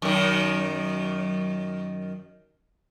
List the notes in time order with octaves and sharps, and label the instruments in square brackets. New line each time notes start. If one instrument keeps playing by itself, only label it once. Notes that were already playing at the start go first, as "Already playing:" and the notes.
[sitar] F#2 D#3